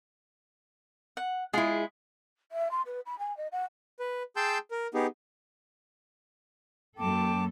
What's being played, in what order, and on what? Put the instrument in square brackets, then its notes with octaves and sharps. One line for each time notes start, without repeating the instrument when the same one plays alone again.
[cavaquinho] F#5
[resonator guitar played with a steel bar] G#3 E4 [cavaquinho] F4 G#4
[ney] E5
C6
B4
B5
G#5
D#5
F#5
[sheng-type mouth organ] B4
G#4 G5 A5 C6 E6 G6
A#4
B3 D#4 G4 G#4
[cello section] F#2 A#3 A4 [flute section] G5 A5 D6